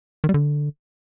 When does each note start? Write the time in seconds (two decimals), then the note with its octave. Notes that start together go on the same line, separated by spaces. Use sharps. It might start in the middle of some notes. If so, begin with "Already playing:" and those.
0.24 D#3
0.29 G3
0.34 D3